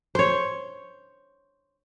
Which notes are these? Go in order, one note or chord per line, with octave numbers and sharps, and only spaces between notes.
C5 C#5